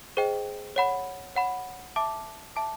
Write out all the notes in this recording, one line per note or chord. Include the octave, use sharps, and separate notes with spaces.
G#4 C5 D#5 G5
C#5 F#5 B5
C#5 F#5 B5
E5 A5 D6
E5 A5 D6